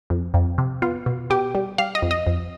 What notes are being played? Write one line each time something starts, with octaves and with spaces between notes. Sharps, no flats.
F2
F2
C3
B3 F4
B2
B2 G4
G3
G3 F5
D#5
F2
D#5
F2